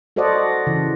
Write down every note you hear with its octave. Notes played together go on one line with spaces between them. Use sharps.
F#4 A4 C5 D5 D#5 F#5
C#3 E3